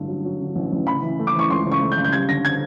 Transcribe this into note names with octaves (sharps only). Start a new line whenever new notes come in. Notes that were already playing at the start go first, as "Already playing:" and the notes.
Already playing: A1 G2 D3
F#3
F#3
D3
A1
A1
C#3 B5
E3
A3
D6
E3 C#6
C#2 C6
C#3
C#6
A3
G6
C#3
G6
G3 G#6
D3 A#6
G#6